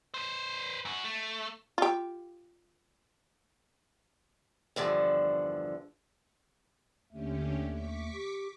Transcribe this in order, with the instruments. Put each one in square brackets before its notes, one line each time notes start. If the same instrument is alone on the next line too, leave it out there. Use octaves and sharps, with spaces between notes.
[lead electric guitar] B4 C5
F#2 F#4
A3
[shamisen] F4 G4
[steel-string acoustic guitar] E2 G2 D3 F3
[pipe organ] D#2 A3 [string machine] D3 C#4 G4
[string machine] C#6 D6 B6
[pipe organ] G4